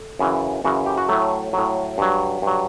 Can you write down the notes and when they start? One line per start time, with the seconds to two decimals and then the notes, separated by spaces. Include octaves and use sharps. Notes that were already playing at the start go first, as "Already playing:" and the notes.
Already playing: A4
0.19 F#2 C#3 E3
0.64 F#2 C#3 E3 F#4
0.86 G4
0.97 F#4
1.08 A2 F#3 A3
1.53 A2 F#3
1.98 G2 F#3
2.42 G2 F#3